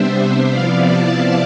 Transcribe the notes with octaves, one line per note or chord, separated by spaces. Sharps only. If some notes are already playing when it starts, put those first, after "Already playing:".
Already playing: C3 G3 B3 D4 C5 E5
C3 F3 B3 E4 D5 F5
F5 A5